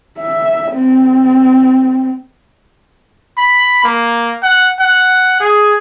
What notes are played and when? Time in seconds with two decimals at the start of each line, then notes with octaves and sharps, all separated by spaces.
0.19 E5
0.73 C4
3.37 B5
3.84 A#3
4.43 F#5
4.79 F#5
5.40 G#4